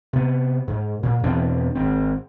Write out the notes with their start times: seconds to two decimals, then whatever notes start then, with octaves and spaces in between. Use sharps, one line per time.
0.13 C3 B3
0.67 G#2
1.03 A#2
1.23 E2 B2 C4 D4
1.75 G#1 C4